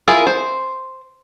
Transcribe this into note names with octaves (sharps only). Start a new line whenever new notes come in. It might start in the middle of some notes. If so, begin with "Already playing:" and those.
E4 F4 G#4 A#4
C5